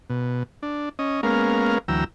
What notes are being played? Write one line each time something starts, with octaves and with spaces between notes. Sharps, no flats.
B2
D4
C#4 D#5
G#3 A#3 B3 C#4 A#4 F5
D2 E3 F#3 G5 A#5 E6